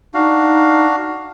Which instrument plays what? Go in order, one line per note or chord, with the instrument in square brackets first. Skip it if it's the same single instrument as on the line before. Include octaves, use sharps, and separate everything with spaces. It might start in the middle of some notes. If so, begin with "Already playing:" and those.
[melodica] D4 F#4 F5 [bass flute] D#4